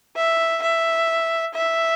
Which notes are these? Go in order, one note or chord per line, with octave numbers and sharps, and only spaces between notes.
E5
E5
E5